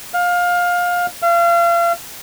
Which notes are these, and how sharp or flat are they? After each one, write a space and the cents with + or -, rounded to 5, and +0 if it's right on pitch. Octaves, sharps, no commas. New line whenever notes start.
F5 +20
F5 -35